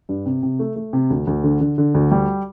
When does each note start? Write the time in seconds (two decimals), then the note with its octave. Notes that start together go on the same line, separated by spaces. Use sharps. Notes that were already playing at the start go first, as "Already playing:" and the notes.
0.09 G2
0.26 C3
0.43 C3
0.59 A3
0.76 A3
0.93 C3
1.10 D2
1.27 D2
1.44 D3
1.61 D3
1.78 D3
1.95 D2
2.11 G3